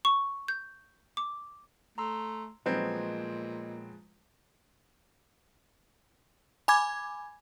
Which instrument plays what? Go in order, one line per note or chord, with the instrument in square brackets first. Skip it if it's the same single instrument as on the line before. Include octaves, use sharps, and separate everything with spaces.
[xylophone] C#6
G6
D6
[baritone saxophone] A3 [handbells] A#5 C6 E6
[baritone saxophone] A#2 [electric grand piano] F3 G#3 [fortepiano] F#3 B3 C4 [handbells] D#5 G#6
[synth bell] G#5 B5 D6 G#6